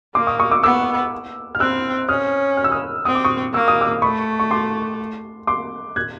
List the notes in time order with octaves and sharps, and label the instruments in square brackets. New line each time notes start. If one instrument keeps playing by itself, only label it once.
[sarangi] A#3 [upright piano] C6 D6
[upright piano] C#6 D#6
C#6 D#6
D6 E6
[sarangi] B3 [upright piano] D6 E6
[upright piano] F6
[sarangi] C4 [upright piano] E6 F#6
[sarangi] C#4 [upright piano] D#6 F6
[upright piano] F6
E6
D#6 F6
[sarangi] C4 [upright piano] D#6
[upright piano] D6
C#6 D#6
[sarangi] A#3 [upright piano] E6
[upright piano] D#6
D6 E6
[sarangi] A3 [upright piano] B5 C#6
[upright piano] C#6
C6 D6
C6 D6
F#6 G#6